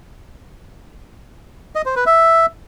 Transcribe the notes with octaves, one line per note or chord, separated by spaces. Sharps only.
D#5
C5
B4
E5